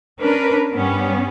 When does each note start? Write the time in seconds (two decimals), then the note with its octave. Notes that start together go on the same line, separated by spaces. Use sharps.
0.20 C#4 D4 A#4 B4
0.74 G2 G3 B3 C#4